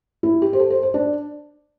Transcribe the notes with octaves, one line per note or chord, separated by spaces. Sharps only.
E4
G4
C5
A4
C5
C5
D4